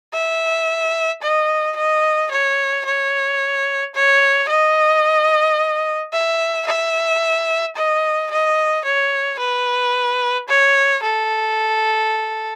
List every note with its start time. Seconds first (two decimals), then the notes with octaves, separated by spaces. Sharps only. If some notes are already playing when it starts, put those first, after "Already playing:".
0.13 E5
1.22 D#5
1.76 D#5
2.31 C#5
2.85 C#5
3.95 C#5
4.49 D#5
6.13 E5
6.67 E5
7.76 D#5
8.31 D#5
8.85 C#5
9.39 B4
10.48 C#5
11.03 A4